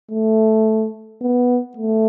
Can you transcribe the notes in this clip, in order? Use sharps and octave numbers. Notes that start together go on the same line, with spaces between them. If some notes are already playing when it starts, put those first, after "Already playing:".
A3
B3
A3